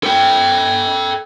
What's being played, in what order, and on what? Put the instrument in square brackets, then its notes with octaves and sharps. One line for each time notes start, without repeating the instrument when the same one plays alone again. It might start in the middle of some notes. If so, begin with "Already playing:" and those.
[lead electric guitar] A4 G5